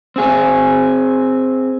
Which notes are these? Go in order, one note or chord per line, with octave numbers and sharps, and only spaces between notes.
C4 G#4